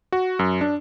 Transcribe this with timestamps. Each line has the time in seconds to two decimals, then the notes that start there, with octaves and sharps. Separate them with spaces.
0.12 F#4
0.39 F#2
0.61 D4